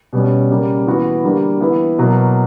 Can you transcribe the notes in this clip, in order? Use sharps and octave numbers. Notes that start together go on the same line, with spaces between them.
B2 G3 C#4
C#3 G3 A#3
E3 B3 F#4
D3 G3 A#3
E3 B3 E4
B2 F#3 A#3